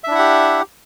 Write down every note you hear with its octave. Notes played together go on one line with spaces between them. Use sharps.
D4 E4 G4 E5 F#5